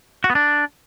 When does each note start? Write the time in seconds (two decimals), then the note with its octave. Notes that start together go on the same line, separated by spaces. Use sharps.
0.24 F#4
0.30 B3
0.35 D4